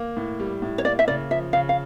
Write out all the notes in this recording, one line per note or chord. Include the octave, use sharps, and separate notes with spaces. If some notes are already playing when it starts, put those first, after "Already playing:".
Already playing: A#3
A2
G3
A2
C#5
A#3 D5
E5
C#3 D5
F3 E5
C#3 F5
F5